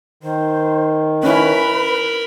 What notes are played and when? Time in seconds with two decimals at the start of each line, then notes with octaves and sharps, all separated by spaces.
0.23 D#3 C5
1.24 C#4 E4 A#4 B4 B5